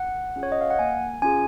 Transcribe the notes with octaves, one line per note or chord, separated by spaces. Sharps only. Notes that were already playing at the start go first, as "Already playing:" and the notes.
Already playing: F#5
C#4 F4 G#4
C#5
D#5
F5
F#5
A#3 G#5
C#4 F4 G#4 G#5